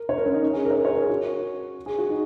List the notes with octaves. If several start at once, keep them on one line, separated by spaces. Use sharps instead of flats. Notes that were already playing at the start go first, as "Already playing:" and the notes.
Already playing: A#4
C#5
A#4
C#4
D#4
A#4
G#4
A#4
C#5
A#4
C#5
G#4
A#4
G#4
F#4
G#4
F#4
D#4